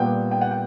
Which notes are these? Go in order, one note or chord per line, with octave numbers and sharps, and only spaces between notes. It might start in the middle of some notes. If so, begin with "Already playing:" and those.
Already playing: A#2 G3 B3 F#5 G5
G5
F#5
G5